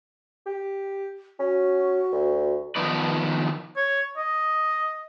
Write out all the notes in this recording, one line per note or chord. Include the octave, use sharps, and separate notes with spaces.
G4
C#4 F#4
D2
D#3 F3 B3 D#4 B4 D5
C#5
D#5